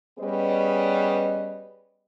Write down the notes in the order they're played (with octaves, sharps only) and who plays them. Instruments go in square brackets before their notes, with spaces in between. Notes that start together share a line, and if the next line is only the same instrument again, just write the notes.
[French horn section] G3 B3 C#4 G#4 B4 D#5